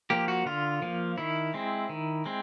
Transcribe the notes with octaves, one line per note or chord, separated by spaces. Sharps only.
F3 A#3 G4
F#4
D3 F4
F3 A#3
D#3 E4
G#3 C4
D#3
G#3 C4